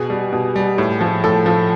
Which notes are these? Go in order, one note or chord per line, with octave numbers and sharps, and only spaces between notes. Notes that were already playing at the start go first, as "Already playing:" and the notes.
Already playing: B2 G#4
G3
B2
G3
A2
F3
A2 A4
F3